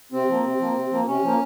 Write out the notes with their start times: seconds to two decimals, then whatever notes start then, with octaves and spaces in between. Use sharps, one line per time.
0.12 C3 C4
0.28 F3 A#3
0.44 C3
0.59 F3 A#3
0.76 C3
0.91 F3 A#3
1.07 C3 C#4
1.23 F3 A#3